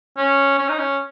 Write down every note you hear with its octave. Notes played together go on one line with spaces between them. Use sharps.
C#4
C#4
D#4
C#4